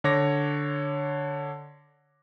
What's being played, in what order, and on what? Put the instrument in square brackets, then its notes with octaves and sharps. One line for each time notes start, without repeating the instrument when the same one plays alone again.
[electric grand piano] D3 C#5 D6 A#6